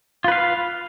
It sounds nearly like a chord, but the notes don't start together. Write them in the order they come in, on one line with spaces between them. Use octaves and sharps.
F4 B4 F5